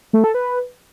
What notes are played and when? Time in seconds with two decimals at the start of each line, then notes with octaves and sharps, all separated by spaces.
0.13 A3
0.24 A4
0.34 B4